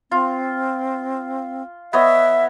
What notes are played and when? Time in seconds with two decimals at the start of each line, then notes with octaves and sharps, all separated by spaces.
0.11 C4 F4
1.93 B3 C#5 D#5 E5